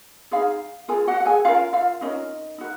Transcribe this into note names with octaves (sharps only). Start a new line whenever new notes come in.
D#4 F4 G#4 F5
F4 G#4 A#4 G#5
F#4 F#5
F#5
G#4 G#5
C#4 F4 A#4 F5
F4 F5
C#4 D#4 F4 A#4 D#5
D#4 F#4 A#4